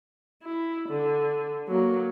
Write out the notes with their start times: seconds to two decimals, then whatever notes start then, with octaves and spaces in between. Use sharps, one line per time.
0.43 E4
0.89 D3
1.68 F#3 A#3